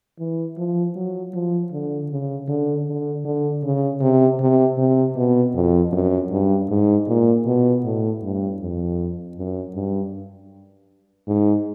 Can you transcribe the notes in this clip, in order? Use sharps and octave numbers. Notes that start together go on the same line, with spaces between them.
E3
F3
F#3
F3
D3
C#3
D3
D3
D3
C#3
C3
C3
C3
B2
F2
F#2
G2
G#2
A#2
B2
A2
G2
F2
F#2
G2
G#2